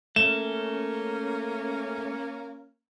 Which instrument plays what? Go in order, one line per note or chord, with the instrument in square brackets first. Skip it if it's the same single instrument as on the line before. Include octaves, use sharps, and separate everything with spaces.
[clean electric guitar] A3 [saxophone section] A#3 C#4 [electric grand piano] E7